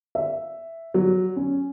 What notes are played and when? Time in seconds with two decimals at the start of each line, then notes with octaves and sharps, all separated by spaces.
0.15 E5
0.94 F#3
1.36 C#4